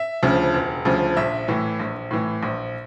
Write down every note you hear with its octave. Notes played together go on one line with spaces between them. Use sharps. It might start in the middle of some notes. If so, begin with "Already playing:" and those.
Already playing: E5
D2 C#3 F3
E1
D2 C#3 F3
A#1 E5
A2 E3
A#1
A2 E3
A#1